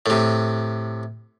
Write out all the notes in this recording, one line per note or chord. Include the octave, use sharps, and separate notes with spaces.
A2 C3